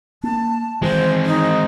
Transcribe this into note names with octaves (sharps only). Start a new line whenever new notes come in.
A#3 A5
D#3 E3 G#3 C4 C5
D#4